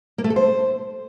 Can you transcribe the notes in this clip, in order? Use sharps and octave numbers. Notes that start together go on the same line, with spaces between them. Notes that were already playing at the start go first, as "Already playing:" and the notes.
A#3
A3
A4
C5